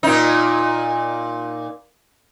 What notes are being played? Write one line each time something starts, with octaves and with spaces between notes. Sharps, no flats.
A#2 D#4